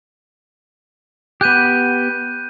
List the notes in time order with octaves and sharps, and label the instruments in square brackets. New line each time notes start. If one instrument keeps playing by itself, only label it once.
[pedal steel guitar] B3 G4 [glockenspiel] F#6 G6 D#7